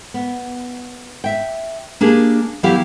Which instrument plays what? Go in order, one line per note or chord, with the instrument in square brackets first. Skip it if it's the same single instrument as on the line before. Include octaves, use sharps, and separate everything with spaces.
[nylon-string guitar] B3
E5 G5
A#3 D4 G4 G#4
E3 F#3 B3 E4 G4 F5